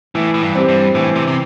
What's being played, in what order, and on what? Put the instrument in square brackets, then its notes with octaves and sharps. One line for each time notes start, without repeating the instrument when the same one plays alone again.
[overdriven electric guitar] A2 [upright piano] E3
[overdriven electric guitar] A2
G2
[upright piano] C4 G4
[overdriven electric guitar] G2
[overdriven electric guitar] A2 [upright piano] E3
[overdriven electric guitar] C3
C3